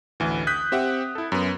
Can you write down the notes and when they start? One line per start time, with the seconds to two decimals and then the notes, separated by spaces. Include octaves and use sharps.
0.20 A1 D2 E3
0.47 D#6 F#6 G6 B6
0.72 C4 G4 E5 F#5
1.15 E4 A4
1.32 F#2 B3